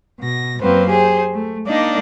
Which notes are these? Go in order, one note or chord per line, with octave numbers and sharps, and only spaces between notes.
B2 A#6
F#2 F#3 A#3 C4 B4 C5
G4 G#4 C5
A3
A#3 D4 D#4 D5 D#5